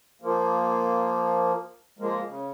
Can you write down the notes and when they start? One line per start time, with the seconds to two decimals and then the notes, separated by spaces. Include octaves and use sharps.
0.22 F3 A#3
1.99 F3 G#3 A#3
2.27 C#3